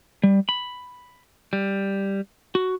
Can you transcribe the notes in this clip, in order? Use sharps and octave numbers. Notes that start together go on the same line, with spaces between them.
G3
B5
G3
F#4